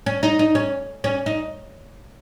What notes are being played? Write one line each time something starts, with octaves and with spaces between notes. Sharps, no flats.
C#4
D#4
D#4
C#4
C#4
D#4